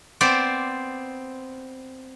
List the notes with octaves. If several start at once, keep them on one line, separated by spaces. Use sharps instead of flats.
B3 C4 C5 D5